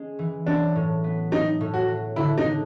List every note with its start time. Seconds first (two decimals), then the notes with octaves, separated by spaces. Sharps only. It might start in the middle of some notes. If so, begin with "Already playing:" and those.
Already playing: G#3 C#4
0.19 E3
0.46 F#3 D4
0.76 A2
1.04 B3
1.31 F#3 D#4
1.61 A2
1.74 F#4
1.88 F#3
2.16 D3 E4
2.38 D#4
2.45 D3